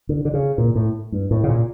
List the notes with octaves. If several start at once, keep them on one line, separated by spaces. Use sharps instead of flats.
D3
D3
C#3
A#2
A2
G2
A2
C#3
A#2